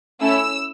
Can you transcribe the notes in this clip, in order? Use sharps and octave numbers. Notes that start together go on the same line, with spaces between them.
A3 C#4 E4 E6